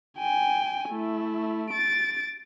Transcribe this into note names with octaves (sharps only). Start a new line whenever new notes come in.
G5 G#5
A3 E4
A6 D7